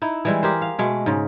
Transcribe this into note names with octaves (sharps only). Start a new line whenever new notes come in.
D#4 E4
E3 G3 G#3
G4 G#4 A#4 C5
F5
B2 G#3 A3
G#2 C#3